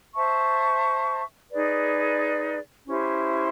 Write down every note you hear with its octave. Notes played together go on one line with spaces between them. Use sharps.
C5 E5 A5 C#6
D#4 G#4 B4 D5
C#4 E4 G4 C5